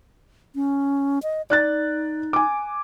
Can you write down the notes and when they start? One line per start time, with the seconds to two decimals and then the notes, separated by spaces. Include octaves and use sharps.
0.55 C#4
1.23 D#5
1.50 D#4 D5 F#6 A6
2.33 G#5 D6